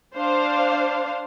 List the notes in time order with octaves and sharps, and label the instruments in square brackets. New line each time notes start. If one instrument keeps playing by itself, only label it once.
[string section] D4 C5 F5